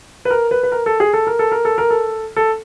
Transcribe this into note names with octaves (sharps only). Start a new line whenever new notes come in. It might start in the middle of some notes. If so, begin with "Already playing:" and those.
B4
A#4
B4
B4
A#4
A4
G#4
A4
A#4
A4
A#4
A4
A#4
A4
A4